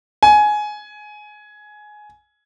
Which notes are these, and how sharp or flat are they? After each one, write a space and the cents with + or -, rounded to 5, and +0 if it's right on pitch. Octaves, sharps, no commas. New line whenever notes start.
G#5 +15